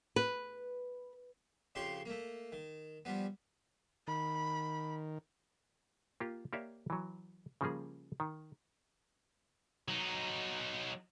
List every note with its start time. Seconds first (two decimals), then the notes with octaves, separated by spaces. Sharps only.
0.16 B4
1.75 F2 C#3 G4 C6 C#6
2.06 A3 A#3
2.52 D#3
3.05 F3 G3 B3
4.07 D#3 B5
6.20 A#3 F4 G4
6.53 A#3 G4 C#5 D5 E5 F5
6.90 E3 F#3
7.61 C#3 F3 G3 A#3 G#4
8.20 D#3
9.88 F#3 D#4